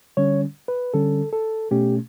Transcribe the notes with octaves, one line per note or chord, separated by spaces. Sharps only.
D3 G3 C#4 C#5
B4
D3 G3 C#4 A4
A4
B2 A3 C#4 G4